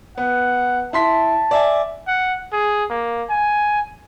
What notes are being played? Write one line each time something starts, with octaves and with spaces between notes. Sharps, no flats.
B3 F#5
E4 A5 C6 B6
D5 E5 G#5
F#5
G#4
A#3
G#5